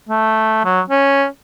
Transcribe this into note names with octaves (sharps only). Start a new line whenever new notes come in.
A3
F#3
C#4